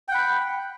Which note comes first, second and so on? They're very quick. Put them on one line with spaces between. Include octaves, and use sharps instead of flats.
G5 F#5 B5